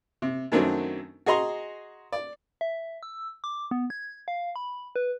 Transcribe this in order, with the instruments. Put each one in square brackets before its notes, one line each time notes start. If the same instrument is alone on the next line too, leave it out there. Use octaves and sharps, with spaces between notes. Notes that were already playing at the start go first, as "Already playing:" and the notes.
[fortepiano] C3
F#2 D#3 F#3 A3 C4 D4
F#4 G#4 D#5 A#5 C6
D5
[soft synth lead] E5
E6
D6
B3
G#6
F5
B5
B4